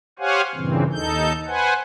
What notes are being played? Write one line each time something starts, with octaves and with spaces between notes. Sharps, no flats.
G4 C5 C#5 F5 F#5 G#5
G2 A#2 C#3 E3 C4
D#2 D#4 A4 G6
B4 C5 F#5 G#5